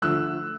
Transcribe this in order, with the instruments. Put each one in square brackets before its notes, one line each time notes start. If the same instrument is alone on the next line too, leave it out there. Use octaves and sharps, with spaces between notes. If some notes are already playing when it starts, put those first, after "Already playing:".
[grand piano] D3 F3 A3 E6 F#6